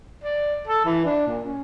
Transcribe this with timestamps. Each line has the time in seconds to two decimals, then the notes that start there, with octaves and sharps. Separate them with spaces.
0.24 D5
0.68 A4
0.85 E3
1.05 D4
1.27 A#2
1.45 C#4